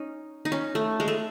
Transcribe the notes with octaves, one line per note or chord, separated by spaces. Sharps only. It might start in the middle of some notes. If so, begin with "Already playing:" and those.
Already playing: C#4 D#4
D#4
C#4
A3
G#3
A3